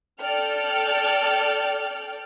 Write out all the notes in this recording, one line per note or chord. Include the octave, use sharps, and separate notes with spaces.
A4 D5 G5 F6